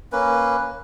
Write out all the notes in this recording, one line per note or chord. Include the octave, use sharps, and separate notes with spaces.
A#3 C#4 B4